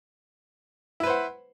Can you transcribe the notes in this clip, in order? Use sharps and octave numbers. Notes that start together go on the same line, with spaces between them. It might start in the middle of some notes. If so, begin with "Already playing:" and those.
E4 B4 C5 F#5